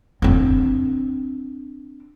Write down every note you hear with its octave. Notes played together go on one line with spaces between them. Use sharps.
C4 D4